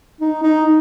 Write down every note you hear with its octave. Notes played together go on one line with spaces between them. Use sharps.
D#4
D#4